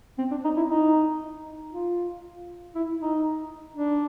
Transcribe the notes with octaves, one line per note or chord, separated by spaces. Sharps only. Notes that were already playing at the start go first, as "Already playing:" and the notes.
C4
D4
D#4
E4
D#4
F4
E4
D#4
D4